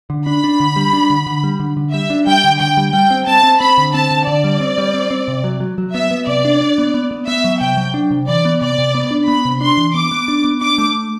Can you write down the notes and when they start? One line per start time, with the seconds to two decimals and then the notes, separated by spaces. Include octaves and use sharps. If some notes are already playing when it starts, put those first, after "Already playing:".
0.10 D3
0.26 D4 B5
0.44 D4
0.60 D3
0.76 G3
0.93 D4
1.10 D3
1.27 D3
1.44 G3
1.60 D3
1.77 D3
1.93 G3 E5
2.10 D4
2.27 G3 G5
2.44 D3
2.60 D3 G5
2.77 G3
2.93 G3 G5
3.10 C4
3.26 C4 A5
3.43 C4
3.60 C4 B5
3.78 D3
3.94 C4 A5
4.11 D3
4.27 D3 D5
4.44 G3
4.60 C4
4.78 G3
4.94 C4
5.11 C4
5.28 C3
5.44 F#3
5.60 F#3
5.78 F#3
5.94 B3 E5
6.11 B3
6.27 C3 D5
6.45 D4
6.61 D4
6.78 B3
6.94 B3
7.11 B3
7.28 B3 E5
7.44 F#3
7.60 C3 G5
7.77 F#3
7.94 D4
8.11 C3
8.27 E3 D5
8.45 B3
8.61 C3 D5
8.78 C3
8.95 B3
9.11 D4
9.28 B3 B5
9.45 C3
9.61 D4 C6
9.77 E3
9.94 B3 D6
10.12 B3
10.28 D4
10.44 B3
10.61 D4 D6
10.78 A3